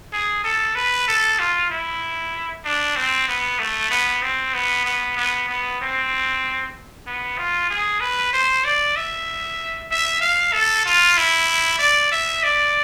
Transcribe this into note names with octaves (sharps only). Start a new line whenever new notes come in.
G#4
A4
B4
A4
F4
E4
D4
C4
B3
A3
B3
C4
B3
B3
B3
B3
C4
B3
F4
G#4
B4
C5
D5
E5
E5
F5
A4
F4
E4
D5
E5
D5